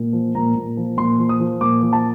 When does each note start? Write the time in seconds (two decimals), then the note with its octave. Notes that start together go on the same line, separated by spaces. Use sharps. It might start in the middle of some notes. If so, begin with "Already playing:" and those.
Already playing: A#2
0.13 F3
0.35 A#2 A#5
0.55 A#2
0.77 F3
0.97 A#2 C6
1.19 F3
1.29 D#6
1.40 F3
1.61 A#2 D6
1.82 F3
1.93 A5